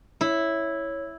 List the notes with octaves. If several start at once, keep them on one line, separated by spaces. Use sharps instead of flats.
E4 C#5